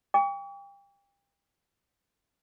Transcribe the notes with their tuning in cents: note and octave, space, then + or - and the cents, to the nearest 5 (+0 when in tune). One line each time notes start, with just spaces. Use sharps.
G5 +30 C#6 +45